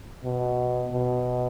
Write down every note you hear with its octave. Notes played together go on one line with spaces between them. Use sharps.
B2
B2